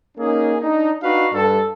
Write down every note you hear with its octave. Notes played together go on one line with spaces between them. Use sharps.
A#3 C#4 D#4 G#4
D4 D#4
D4 D#4 F#4 B4 F5
G2 A4